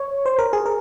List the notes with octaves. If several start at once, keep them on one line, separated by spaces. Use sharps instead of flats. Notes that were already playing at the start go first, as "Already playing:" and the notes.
Already playing: C#5
C5
A#4
G#4
A#4